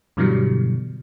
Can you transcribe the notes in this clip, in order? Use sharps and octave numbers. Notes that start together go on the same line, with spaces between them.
G2 B2 D3 E3 F#3 G3